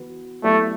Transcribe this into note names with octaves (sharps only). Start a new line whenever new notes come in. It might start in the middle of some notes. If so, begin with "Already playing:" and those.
Already playing: E3 B3 F#4 B4
F#3 A3 B3 E4 G4 D5